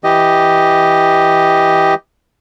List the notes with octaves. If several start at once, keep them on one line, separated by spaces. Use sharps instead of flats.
E3 G4 D#5